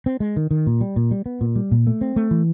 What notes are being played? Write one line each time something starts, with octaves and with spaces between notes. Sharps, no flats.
C4
G#3
D#3
D#3
A#2
G3
A#2
G3
B3
A#2
G3
A#2
A3
C4
A3
E3